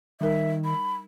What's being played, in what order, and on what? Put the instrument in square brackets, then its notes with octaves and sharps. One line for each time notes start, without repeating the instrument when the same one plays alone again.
[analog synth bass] D#3 [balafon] G3 D#4 A#4 [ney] E5
[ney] B5